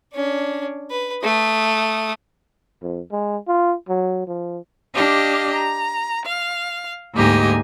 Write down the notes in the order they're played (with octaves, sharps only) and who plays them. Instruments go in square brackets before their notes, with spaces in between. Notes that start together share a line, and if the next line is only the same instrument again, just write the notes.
[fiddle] C#4 D4
B4
A3 D#6
[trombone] F2
G#3
F4
F#3
F3
[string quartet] D4 G4 D#5 F5
A#5
F5
D2 G#2 A#3 G4 D#5 G#5